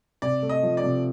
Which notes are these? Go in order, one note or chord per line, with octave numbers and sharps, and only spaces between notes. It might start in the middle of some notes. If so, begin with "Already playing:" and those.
C3 D5
A3
D#5
F3
D5
C3